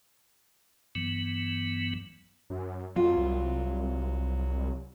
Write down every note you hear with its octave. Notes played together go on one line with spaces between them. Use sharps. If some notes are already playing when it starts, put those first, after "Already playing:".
G2 E3 F#3 B3
F#2
F2 F#3 F4
C2